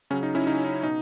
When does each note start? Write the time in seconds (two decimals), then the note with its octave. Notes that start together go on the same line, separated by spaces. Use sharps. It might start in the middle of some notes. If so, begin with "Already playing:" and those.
0.10 C#3 F#3 C#4
0.23 D#4
0.35 C#4 E4
0.47 C#3 D#4
0.50 F#3
0.64 D#4
0.83 B2 D#4